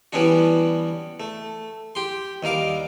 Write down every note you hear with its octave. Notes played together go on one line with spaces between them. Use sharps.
E3 G3 B3 C#4 D4 F#4
A3
G4 C6
D#2 G3 A#4 F5 D6